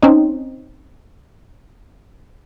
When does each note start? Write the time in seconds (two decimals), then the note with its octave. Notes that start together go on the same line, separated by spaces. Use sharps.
0.03 C4 C#4 D#4